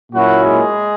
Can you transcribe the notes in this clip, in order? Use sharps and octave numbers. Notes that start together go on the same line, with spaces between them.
A#2 F#3 A#3 C#4 E4 F#4
G#3 G#4